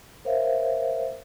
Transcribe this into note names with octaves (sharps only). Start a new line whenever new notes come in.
A#4 C5 C#5 E5 F5